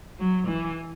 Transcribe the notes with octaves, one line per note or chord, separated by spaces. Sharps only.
F#3
E3